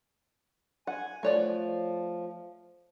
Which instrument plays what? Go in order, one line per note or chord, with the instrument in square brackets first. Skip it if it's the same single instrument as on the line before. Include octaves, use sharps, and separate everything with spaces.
[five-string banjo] F#5 [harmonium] G#5
[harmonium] F3 [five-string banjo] A3 C#5 D5